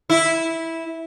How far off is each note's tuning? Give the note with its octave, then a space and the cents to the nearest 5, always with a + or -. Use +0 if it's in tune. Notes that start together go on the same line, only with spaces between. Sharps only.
E4 -10